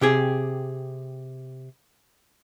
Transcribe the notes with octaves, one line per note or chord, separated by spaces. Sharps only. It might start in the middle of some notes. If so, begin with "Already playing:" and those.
C3 G4 G#4